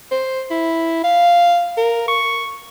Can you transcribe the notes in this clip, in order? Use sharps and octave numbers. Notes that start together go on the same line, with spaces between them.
C5
E4
F5
A#4
C#6